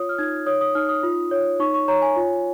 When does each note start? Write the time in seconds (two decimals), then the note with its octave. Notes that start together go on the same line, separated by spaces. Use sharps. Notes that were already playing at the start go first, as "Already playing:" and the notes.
Already playing: F4 C#5 D#6
0.09 F6
0.18 D#4 G#6
0.47 C#5 D#6
0.61 D#6
0.75 D#4 F6
0.89 D#6
1.03 F4
1.31 C#5
1.60 D#4 C#6
1.74 C#6
1.88 C#5 A#5
2.02 G#5
2.16 F4